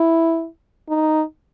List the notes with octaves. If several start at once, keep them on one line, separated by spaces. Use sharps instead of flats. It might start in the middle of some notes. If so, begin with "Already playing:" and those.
Already playing: E4
D#4